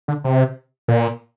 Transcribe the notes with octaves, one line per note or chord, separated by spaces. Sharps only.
D3
C3
A#2